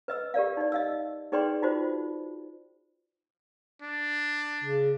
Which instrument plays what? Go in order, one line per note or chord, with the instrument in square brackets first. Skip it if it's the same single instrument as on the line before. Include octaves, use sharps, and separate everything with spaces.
[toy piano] B4 D#5 E6
G4 A#4 D5 F5
D#4 D5
D#5 F5 E6
D#4 G#4 B4 D5 G5 C6
D#4 F4 F#4 C5
[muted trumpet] D4
[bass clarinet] C#3